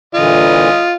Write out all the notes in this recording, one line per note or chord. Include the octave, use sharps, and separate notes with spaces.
A#2 D3 E3 F4 D#5